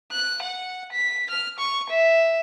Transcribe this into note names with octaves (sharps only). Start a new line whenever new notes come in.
F#6
F#5
B6
F6
C#6
E5